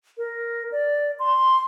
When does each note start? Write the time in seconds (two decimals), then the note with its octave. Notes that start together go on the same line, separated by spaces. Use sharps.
0.17 A#4
0.72 D5
1.19 C6